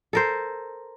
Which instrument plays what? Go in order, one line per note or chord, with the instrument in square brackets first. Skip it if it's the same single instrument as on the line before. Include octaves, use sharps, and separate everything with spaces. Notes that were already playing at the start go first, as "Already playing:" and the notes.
[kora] A4 A#4 C5